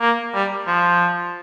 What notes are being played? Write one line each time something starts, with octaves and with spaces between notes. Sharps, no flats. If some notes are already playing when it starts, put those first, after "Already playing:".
A#3
G3
F3